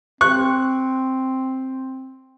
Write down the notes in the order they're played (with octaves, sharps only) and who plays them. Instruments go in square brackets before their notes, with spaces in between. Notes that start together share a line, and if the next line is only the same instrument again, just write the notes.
[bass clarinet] C4 [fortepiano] C#6 F#6